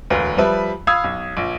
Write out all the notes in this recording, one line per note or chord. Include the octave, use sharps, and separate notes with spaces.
E1 D2 B4 F5
F3 G3 B4 E5
F5 B5 D#6 E6 G#6
B1
A#1